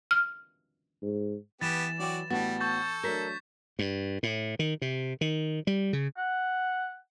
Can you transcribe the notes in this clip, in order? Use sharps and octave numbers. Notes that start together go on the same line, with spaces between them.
F6
G#2
E3 B3 G4 A6 E7
F#3 F#4 D5 G5 D6
A2 G3 B3 F#4 A6
A4 C#6 G6 A6
F#3 A3 D4 A#4 G6 B6
G2
A2
D#3
C3
D#3
G3
C#3
F#5